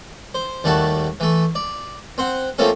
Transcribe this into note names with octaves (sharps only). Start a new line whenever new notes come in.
C5
D#2 G3 A3 F#4 A5
E3 A3
D5
C4 C5 F#5
F3 A3 A#3 C4 C#4 A4